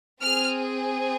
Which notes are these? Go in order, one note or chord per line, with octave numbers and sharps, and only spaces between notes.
C4 G#4 F6